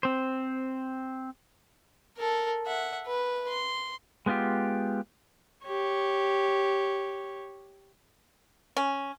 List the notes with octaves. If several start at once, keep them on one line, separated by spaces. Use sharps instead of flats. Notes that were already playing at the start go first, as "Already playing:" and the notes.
C4 C5
A4 A#4
E5 F#5
B4
C6
G#3 B3 E4 F4 G4
G4 C#5
C#4